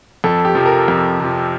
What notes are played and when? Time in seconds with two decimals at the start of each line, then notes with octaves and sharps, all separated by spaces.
0.24 F2 A4
0.45 G4
0.55 C3 F3
0.66 A#4
0.88 F2
1.20 C3 F3